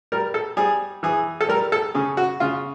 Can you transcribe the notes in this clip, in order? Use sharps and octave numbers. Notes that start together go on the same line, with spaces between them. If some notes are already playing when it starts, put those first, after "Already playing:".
G3 A#4
A4
G3 G#4
E3 G#4
A4
G3 A#4
A4
C#3 G#4
F#4
C#3 F4